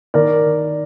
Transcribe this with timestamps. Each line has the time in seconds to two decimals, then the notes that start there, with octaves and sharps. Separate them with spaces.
0.14 D#3 A#4 D5